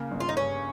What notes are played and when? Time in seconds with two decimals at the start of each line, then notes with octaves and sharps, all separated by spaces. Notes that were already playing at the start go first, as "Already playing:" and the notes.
Already playing: C#3 A#3
0.11 G1
0.20 F4
0.29 D#4
0.37 G2 C#4